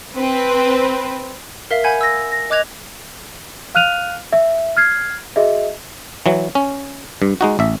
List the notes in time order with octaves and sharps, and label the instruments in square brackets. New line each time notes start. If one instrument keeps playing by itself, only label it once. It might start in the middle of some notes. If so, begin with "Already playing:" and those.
[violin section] C4 B4
[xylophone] A#4 E5 F5 B6
F#5 G#5 B5 G6 G#6
E6 A#6
A#6
D#5 D6 F#6 G#6 F7
[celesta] F5 F6 F#6 D#7 F7
E5
F6 G#6 C7
F#4 G#4 D#5 E5
[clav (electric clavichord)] E3 F#3
C#4
G2
G#3 D#4 F#4
A1 E5